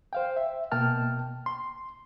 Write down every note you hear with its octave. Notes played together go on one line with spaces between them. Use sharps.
C5 F5 G5
E5
B2 A#3 G5 A5 F6
C6